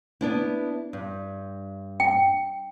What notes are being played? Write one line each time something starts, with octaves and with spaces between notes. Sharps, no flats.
B3 D4 E4
G2
G5